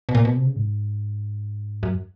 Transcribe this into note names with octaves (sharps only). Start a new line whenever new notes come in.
B2
A#2
B2
C3
C#3
G#2
F#2